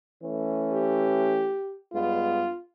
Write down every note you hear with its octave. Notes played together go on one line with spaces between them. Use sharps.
E3 A3 C#4
G4
G2 G#3 B3 F4